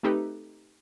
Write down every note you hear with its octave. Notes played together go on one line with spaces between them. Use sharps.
A3 C4 D#4 G4 A4 B4